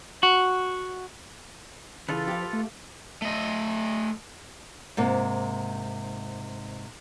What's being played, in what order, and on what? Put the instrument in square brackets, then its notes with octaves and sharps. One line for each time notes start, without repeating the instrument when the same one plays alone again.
[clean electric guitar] F#4
[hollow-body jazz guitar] C#3 E3 [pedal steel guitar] F4 A4 B4
[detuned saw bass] F3 [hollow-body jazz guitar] G4 F5
[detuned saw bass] A3
[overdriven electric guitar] A3 D#5
[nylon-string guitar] G#2 C3 A#3